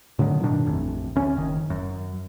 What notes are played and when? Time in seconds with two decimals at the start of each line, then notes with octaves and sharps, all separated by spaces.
0.19 A2 D3 D#3 F#3
0.43 G2 B2 D#3 D4
0.65 D#1 A1 F2
1.16 D2 C#4
1.37 F#1 D#3
1.70 F#2